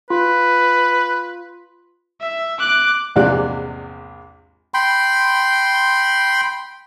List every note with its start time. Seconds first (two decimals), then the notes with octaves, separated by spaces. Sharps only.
0.10 F4 B4
2.21 E5
2.59 D6 F#6
3.16 A#1 E2 G#2 C3 D5 F#6
4.74 G5 B5 C6